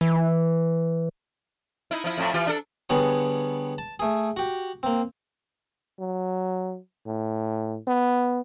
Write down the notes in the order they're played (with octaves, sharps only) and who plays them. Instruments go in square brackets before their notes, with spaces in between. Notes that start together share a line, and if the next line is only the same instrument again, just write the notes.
[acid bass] E3
[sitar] D#4 E4
F3 E4
F2 A2
E3 F4 G4
D4 A4
[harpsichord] D3 G3 B3 G#4 C#5
A5
A3 G#4
F#4 G4
A#3 C4
[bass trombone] F#3
A2
B3